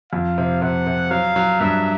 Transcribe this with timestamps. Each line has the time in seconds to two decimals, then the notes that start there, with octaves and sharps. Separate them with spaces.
0.12 F2 F5
0.38 C3
0.62 C3 F#5
0.87 C3
1.11 F#3 F5
1.36 F#3
1.60 G2 E5